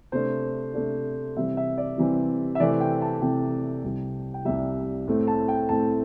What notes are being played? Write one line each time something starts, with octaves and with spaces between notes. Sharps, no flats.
C3 A3 D4 C5
C3 A3 D4
C3 E3 G3 C4 E5
E5
D5
C3 E3 G3 C4
E5
C3 E3 A3 C4 D5
G5
A5
C3 E3 A3 C4 G5
C2 C3 G3
G5
C2 C3 G3 E5
A2 A3 C4
A5
G5
A2 A3 C4 A5